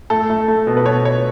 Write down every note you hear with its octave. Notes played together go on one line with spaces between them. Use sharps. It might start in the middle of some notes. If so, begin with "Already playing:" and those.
A3 A4
A3
A3
B2
B4
B2 C#5
B2 C#5